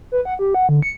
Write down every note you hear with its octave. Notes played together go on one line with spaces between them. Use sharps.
B4
F#5
G4
F#5
D3
C#7